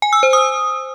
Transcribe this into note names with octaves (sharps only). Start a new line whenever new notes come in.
G#5
E6
C5
D#6